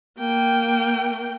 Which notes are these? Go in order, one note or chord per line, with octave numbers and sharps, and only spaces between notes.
A#3 G5